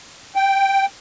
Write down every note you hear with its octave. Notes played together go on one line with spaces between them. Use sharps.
G5